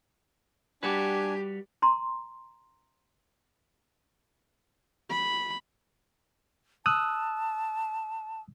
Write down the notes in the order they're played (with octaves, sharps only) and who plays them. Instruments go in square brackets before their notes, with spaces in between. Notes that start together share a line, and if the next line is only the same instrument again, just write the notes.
[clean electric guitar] G3 F#4 B4 [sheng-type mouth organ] D4 G#5 [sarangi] G4
[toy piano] A#5 C6
[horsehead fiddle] B5
[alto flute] A5 [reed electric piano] D#6 E6 F#6